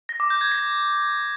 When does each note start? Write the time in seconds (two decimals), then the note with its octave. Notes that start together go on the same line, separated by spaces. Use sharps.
0.09 A#6
0.20 D6
0.30 G6
0.41 G#6
0.52 A#6